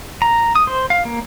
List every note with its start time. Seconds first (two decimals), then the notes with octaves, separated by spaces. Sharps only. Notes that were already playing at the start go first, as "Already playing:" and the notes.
0.22 A#5
0.56 D#6
0.67 C5
0.90 F5
1.05 A#3